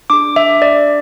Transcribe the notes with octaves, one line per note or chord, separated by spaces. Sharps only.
D4 G#4 D6
E5
D5